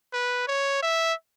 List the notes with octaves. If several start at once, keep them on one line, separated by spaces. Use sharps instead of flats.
B4
C#5
E5